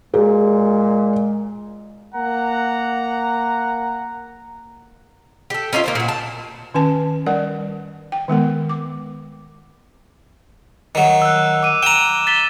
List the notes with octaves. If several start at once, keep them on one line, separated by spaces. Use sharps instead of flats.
A#2 G#3 G#4
A#3 F#5 A#5
G4 A4
C#4 D#4 F4 E5
A#3 D#4 C5
A#2 F#4
A5
D#3 C#4 B4 G#5 A5
G3 A#4 D5 F#5
G5
D#3 G#3 B3 A#4
D6
D#3 F#3
E6 F#6
D6 D#7
G5 A#5 D#7 E7
A6 B6 G7